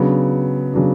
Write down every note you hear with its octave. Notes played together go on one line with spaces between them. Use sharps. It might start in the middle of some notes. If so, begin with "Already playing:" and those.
Already playing: C#3 F#3 B3 D4
C#3 F#3 B3 D4